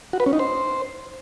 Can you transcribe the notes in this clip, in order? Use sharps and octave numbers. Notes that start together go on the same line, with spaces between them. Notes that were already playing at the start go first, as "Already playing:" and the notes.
F#4
B4
C#4
D#4
C5